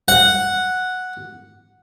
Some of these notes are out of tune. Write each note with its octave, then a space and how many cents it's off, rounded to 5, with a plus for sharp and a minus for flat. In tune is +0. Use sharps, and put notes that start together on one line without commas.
F#5 -5